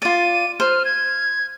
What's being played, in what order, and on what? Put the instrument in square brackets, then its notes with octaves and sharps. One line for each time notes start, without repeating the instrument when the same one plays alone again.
[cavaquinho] F4 D5 [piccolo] D#7
[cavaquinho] C5 [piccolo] F6
[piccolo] G#6